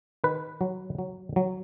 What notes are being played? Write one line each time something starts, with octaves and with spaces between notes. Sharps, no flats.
D#3 B4
F#3
F#3
F#3